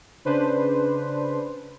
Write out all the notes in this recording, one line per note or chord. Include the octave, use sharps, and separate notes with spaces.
C#3 D4 B4 C5